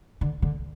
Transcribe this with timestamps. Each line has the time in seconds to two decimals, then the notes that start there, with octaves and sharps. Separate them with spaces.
0.21 D3
0.42 D3